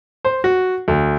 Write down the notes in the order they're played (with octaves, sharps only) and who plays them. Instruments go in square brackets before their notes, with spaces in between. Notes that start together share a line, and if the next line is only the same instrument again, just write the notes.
[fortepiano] C5
F#4
D2